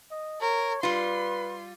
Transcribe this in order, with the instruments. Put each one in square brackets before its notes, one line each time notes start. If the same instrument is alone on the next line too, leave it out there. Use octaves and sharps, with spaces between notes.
[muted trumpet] D#5
[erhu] A#4 [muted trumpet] C#5
[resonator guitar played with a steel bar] G3 F4 [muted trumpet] B4 [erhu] C6